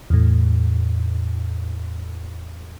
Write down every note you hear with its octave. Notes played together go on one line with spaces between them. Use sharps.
E2 A2